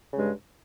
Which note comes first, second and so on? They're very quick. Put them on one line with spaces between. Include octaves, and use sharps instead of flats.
C#3 G#3 G2